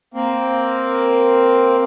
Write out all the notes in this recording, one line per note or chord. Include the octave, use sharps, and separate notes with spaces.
A#3 C4